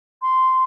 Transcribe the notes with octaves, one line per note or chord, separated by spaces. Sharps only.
C6